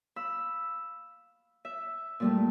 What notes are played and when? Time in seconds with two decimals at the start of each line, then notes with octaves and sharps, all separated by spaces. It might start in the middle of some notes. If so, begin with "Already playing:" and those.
0.16 F5 B5 E6
1.65 E5
2.20 A#2 G3 A3